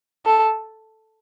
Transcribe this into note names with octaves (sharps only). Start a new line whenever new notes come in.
A4